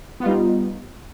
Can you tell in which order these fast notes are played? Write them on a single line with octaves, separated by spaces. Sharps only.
B3 F4 G3 D#4